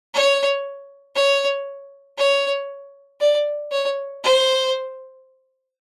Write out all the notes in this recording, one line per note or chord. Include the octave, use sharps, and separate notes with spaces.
C#5
C#5
C#5
D5
C#5
C5